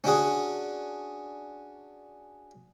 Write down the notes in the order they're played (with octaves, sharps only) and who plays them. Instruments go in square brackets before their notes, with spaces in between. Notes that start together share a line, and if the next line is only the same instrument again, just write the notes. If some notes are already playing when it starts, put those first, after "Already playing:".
[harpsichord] C#4 D4 F#4 G#4